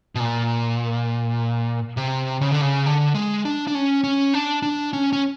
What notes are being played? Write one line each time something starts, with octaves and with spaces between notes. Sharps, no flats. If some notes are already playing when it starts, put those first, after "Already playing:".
B2
A#2
C3
C#3
D3
C#3
D3
G#3
D4
D4
C#4
C#4
D4
D4
C#4
C#4